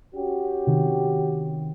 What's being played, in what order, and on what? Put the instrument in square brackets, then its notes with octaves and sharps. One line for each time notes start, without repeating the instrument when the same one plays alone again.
[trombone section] C#4 F#4 G4
[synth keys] C3 D#3